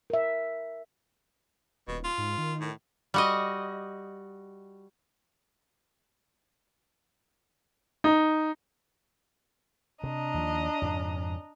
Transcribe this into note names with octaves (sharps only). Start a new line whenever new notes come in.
A#4 E5
D#1 B2
F4
G#2
D#3
A2
G3 F#4 D#5
D#4
C3 D4 D#5 A#5
D#2 F3
F2 G#2 C#3